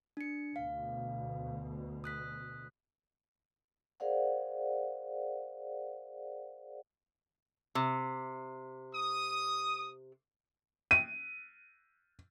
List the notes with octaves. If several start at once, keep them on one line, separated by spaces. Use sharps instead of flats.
D4 C#7
D2 B2 F5
D#6 F#6 B6
G#4 A#4 C5 D5 F5 F#5
C3
D#6
D#7